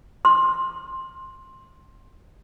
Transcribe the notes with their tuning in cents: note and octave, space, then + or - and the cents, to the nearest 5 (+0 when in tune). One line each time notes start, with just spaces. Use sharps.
C6 +10